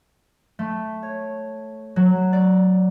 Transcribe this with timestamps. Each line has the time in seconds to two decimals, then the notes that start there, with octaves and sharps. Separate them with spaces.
0.59 A3
1.03 C#5
1.96 F#3
2.33 D5